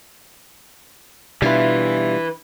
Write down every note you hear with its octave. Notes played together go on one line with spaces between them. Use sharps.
B2 E3 G3 D4 E4 F4 B4 E5